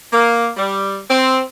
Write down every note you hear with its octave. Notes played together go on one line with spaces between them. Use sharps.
A#3
G3
C4